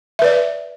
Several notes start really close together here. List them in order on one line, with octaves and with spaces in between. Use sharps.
E5 B4 D5